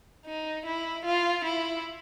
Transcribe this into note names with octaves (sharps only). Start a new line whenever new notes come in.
D#4
E4
F4
E4